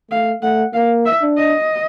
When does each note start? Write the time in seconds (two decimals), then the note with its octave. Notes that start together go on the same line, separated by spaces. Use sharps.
0.11 A3 F5
0.42 A3 F#5
0.74 A#3 F5
1.06 E5
1.22 D4
1.37 D#5